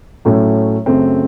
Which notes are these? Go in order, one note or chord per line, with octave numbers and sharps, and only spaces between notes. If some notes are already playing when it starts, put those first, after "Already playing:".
A2 F#3 A3 C#4
F#2 C#3 A3 C4